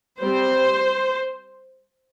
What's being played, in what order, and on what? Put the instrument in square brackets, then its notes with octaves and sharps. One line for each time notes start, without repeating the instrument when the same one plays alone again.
[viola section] G3 C4 C5